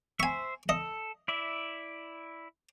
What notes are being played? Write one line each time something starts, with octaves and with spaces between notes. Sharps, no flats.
C5 E5 G#5 C#6
A4 D#5
E4 D5 E5